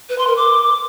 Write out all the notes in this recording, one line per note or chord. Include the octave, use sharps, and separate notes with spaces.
B4
C6
A#4
D6